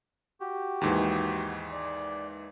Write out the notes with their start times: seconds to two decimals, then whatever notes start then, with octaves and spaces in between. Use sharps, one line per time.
0.41 F#4 G4
0.81 D#2 G#2 E3
1.72 D5